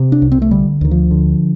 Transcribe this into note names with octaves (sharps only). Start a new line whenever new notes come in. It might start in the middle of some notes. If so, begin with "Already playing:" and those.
Already playing: C3
D4
C2
C4
A3
D3 G3
D2 D#3
F3
D3